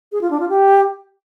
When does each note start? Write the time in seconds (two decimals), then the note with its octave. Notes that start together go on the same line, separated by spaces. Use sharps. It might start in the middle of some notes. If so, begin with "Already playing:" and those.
0.12 G#4
0.21 F4
0.31 D4
0.40 F4
0.49 G4